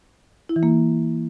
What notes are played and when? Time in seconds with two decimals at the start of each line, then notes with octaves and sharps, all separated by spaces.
0.49 E4
0.56 E3
0.63 A#3